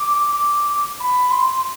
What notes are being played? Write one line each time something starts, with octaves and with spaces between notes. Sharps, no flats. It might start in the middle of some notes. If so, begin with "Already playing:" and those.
Already playing: D6
B5
C6